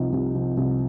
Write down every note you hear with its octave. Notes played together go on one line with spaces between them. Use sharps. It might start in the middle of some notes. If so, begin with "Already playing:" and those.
Already playing: C2 C3 F3 D#4
C2
C3 F3
C2